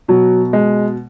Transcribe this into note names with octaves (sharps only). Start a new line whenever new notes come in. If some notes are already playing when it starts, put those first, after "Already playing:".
B2 F#3
G#3